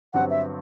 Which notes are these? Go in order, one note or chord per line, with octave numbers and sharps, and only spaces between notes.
G1 G2 F#3 C4 F#5
E5